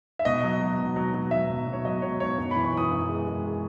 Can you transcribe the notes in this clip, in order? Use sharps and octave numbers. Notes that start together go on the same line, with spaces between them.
E5
B2 D#5
F#3
F#3
B2
F#3
F#3
F#3 E5
B2
B2
C#5
F#3 D#5
B2 C#5
B2 C#5
F#2
E3 B5
C#6
E3 D#6
F#2
G#3
G#3